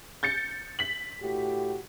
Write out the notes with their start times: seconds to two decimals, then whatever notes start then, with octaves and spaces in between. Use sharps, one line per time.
0.23 G6 A6 C#7
0.79 B6 F#7
1.22 A2 F#4 G4